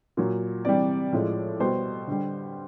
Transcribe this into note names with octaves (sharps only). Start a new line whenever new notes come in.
A#2 F#3
C3 E3 G3 D5
A2 F3 G#3
B2 G3 C5
D3 G3